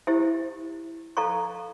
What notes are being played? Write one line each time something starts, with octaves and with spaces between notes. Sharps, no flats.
E4 G4 C5 E5
A4 D5 F5 A#5 C#6